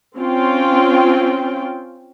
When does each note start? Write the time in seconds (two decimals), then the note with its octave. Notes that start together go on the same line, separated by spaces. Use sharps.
0.17 C4 C#4 F4 G5